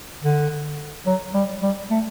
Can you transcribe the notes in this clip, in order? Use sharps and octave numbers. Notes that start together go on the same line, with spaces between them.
D3
F#3
G3
G3
A3